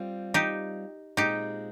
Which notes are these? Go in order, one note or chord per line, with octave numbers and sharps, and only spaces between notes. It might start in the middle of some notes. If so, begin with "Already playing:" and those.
Already playing: G3 C4 F4
D#4 G4
A#2 G#3 C4 D#4 G4